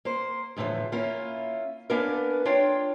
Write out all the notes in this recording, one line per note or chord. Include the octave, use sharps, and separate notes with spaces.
A#3 C5
E2 A2 D3 E3 F3
A#3 C#4 E4 F4
A#3 B3 C#4 D4 A#4
D4 F4 C#5 G5